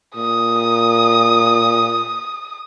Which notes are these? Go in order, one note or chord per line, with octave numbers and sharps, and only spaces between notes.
A#2 D#6